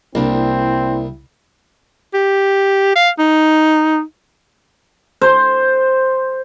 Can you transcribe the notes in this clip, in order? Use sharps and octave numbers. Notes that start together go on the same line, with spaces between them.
C2 A#3 C4 D4 E4
G4
F5
D#4
C5